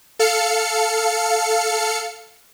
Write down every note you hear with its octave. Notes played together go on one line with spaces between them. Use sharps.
A4 F5 C#7